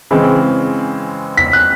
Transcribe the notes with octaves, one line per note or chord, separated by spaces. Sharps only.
C#3 E3 G#3 C4
B6
F#6